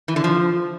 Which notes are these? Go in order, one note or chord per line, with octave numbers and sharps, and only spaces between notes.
E3
D3
F3